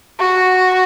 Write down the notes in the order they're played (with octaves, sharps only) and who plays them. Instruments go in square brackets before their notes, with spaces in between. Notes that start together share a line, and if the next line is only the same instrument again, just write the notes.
[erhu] F#4